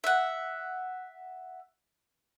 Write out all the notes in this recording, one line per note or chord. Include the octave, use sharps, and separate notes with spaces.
E5 F#5